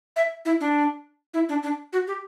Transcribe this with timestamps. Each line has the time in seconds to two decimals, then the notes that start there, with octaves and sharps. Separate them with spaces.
0.16 E5
0.45 E4
0.61 D4
1.34 E4
1.49 D4
1.63 D4
1.93 F#4
2.08 G4